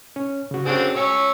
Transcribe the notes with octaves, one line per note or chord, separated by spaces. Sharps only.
C#4
C#3 F#4
D3 C4 C#4 F#4 G#4
C#4 C#5 C#6 E6